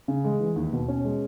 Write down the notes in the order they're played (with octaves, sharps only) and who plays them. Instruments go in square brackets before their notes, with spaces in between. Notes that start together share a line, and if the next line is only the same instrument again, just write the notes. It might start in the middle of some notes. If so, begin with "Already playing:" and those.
[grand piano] C#3
G#3
E3
D#2
B2
C#4
G#3